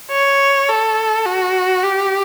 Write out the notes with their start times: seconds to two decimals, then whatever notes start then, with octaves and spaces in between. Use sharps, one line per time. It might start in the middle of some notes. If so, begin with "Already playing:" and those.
0.12 C#5
0.69 A4
1.26 F#4
1.83 G4